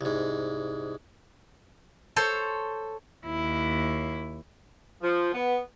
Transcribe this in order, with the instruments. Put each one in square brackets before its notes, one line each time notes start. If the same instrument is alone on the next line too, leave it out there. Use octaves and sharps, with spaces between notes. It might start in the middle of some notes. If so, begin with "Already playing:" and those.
[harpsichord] C2 G#2
[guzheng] A4 C5 C#5
[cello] D#2 E4
[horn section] F3
B3